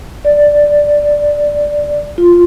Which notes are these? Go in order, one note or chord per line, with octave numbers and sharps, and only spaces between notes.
D5
F4